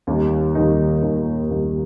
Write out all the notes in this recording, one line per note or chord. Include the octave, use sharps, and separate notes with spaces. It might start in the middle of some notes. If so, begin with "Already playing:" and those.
D#2 D#3 G3 A#3 D#4
D#2 D#3 G3 A#3 D#4
D#2 D#3 G3 A#3 D#4
D#2 D#3 G3 A#3 D#4